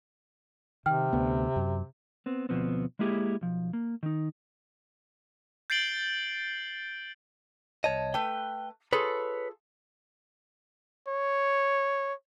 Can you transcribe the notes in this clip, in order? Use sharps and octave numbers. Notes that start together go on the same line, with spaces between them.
C3 D#3 G5 F6
D2 B3
F#2
B3 C4
D2 B2 F3 B3 C4
G#3 A#3 E4 G4 G#4
B1 F3
A#3
D#3 D#4
G6 A6 C7 D7 F#7 G7
C2 C#5 D#5 A5
A3 B4 G5
F4 G#4 A4 B4 C#5 B5
C#5